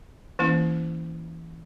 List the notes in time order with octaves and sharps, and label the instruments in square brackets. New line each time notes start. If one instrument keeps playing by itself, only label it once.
[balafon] E3 A#3 C#4 E4